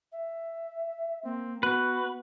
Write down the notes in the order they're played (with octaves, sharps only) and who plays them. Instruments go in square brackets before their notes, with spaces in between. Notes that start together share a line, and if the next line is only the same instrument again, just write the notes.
[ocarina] E5
[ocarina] A#3 [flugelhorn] C4
[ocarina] B3 [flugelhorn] F#4 [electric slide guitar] B4